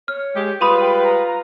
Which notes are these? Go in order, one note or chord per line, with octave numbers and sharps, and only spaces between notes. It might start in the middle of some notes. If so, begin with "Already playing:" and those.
C#5 F6
G#3 G4
G3 G#3 F4 B4 B5 C6 D#6 D#7
G5
A#5
A#5